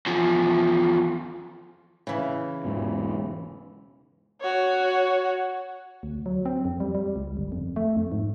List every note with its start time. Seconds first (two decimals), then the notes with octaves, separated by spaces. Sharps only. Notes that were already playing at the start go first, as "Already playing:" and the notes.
0.06 E2 F3
2.07 C#3 E3
2.64 E1 G#2 B2
4.41 F#4 C#5
6.03 D2
6.26 F#3
6.46 C4
6.65 F2
6.80 G3
6.95 G3
7.16 C#2
7.37 G1
7.52 F2
7.76 A3
7.97 F2
8.12 G#2